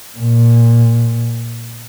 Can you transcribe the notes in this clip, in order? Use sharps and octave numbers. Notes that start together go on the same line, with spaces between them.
A#2